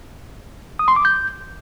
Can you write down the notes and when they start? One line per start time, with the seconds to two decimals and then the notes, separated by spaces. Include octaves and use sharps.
0.79 D#6
0.88 C6
0.96 D6
1.05 G6